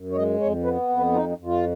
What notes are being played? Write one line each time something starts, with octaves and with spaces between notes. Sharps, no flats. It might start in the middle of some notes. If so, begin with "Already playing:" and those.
Already playing: F#2
C#5
G#3 D#5
F2 C#5
B3 B4
F2
B4
D#4 F4
D#4
F2
F4